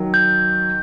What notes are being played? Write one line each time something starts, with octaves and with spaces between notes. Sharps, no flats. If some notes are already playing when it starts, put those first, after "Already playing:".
Already playing: D#3 F#3
G6